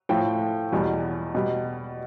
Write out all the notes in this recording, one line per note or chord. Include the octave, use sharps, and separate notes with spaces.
A2 F3 G5
E2 B2 G3
B2 G3